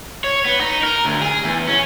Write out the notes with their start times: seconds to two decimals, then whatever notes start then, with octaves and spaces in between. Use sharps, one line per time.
0.24 C#5
0.45 B3
0.61 D#4
0.83 A#4
1.05 D2
1.22 G#4
1.44 E2
1.67 C#4